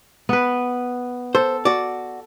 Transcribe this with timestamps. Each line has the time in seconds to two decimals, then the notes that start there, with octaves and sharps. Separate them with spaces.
0.29 B3 B4
1.35 A4 C5
1.65 F#4 D5